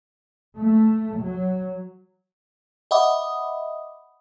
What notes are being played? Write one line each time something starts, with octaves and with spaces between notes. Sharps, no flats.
A3
F#3
D#5 E5 F#5 B5 D6 D#6